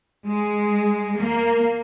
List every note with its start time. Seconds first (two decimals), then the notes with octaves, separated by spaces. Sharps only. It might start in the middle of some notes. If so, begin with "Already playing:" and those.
0.26 G#3
1.19 A#3